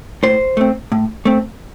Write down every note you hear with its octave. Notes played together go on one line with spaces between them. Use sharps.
A2 C5
A3 C4
A2
A3 C4